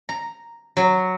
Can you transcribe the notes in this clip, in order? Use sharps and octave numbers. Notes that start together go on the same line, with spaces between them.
A#5
F#3